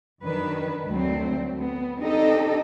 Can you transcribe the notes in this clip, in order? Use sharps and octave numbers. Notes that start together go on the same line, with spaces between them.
F#2 D#3 D4 B4
D2 F#3 A3 C4
B3
C4 D4 D#4 G4 A4 D#5